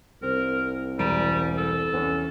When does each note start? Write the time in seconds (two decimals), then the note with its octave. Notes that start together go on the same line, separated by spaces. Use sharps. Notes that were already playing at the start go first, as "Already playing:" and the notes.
0.22 C2 C4 A#4
0.99 E1 G3 A#5 D7
1.58 A4
1.93 E2 C#4